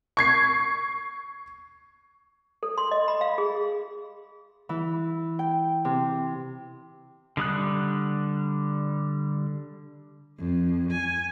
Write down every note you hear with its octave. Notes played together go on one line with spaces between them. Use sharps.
C#6 G#6 C7
A4
C6
D#5
B5
F5
G#4
E3
G5
C3
D3 G3 D#6 F#6
F2
G#5